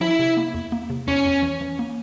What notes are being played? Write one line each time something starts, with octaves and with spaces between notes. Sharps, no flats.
F3 E4
C3
A#3
E2
A#3
C3
E2 C#4
E2
E3
E3
A#3